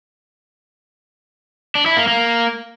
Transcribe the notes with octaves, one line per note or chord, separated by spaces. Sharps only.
D4
E4
A#3
A#3